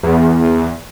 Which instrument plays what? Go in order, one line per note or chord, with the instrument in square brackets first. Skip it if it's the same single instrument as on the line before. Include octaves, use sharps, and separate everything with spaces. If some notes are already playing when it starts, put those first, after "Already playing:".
[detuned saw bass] E2